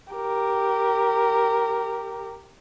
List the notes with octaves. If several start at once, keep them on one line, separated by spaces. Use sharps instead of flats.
G4 A#4